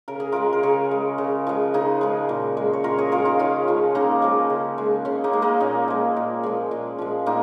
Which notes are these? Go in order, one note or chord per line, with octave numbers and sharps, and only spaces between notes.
C#3 A#4
G#4
G#3 F4 A#4
A#4
C#3 G#4 C#5
G#3
C#3
F3 G#3
C#3 D#4 G#4
F3 G#3
A#2
G#3
C#5
A#2 F4 A#4
G#4 C#5
G#3 F4 A#4
D#4 G#4
C#3 C#4 F4
F3 G#3
C#3 A#3 D#4
F3 G#3
C#3
G#3
C#3 C#4
A#3 D#4
G#3
A#3 D#4
A#2 C#4
F3 G#3
A#2
F3 G#3
A#2
F3 G#3
A#2 A#3 D#4